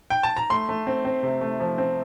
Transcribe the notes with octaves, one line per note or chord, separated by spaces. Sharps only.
G5
A5
A#5
A3 C6
A3
C4
C4
C3
A3
F3
C4